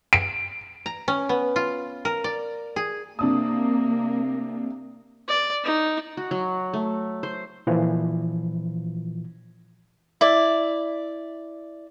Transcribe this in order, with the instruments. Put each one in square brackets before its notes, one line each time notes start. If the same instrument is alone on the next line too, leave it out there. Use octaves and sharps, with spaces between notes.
[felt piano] D7
[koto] A#5
C#4
B3
F4
A#4
D5
G#4
[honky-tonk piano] C3 D4 D#6 [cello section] A#3
[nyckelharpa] D5
D#4
[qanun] F#4
F#3
A3
C5
[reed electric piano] A#2 E3 F3
[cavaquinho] E4 D5